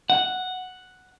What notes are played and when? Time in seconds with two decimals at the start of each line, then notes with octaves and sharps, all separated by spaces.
0.10 F#5